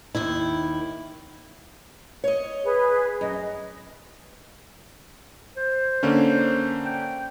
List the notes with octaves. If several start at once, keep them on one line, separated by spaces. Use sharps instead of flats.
D#2 D#3 E4
C#5 D#5
G#4 B4
F#2 D#5
C5
D3 A#3 C#4
G5